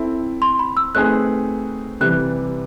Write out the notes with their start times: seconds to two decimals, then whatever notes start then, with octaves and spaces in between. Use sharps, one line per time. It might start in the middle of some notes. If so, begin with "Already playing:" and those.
Already playing: C4 E4 A4
0.42 C6
0.59 B5
0.77 E6
0.95 A3 C4 D#4 G#4 B4 F#6
2.01 C3 E3 G3 F#6